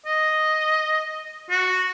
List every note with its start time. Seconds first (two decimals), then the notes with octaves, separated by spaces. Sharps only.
0.06 D#5
1.50 F#4